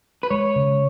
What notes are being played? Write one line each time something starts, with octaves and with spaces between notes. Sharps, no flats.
B4
G#3 C#5
C#3